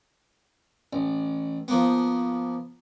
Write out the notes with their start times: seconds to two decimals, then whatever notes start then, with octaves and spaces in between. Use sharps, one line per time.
0.93 A1
1.68 F3 A#3 B3